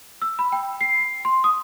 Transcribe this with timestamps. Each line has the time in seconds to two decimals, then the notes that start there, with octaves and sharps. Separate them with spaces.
0.22 E6
0.39 B5
0.52 G5
0.81 C7
1.25 C6
1.44 D#6